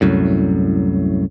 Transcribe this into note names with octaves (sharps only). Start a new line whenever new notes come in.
C2 F#2 A2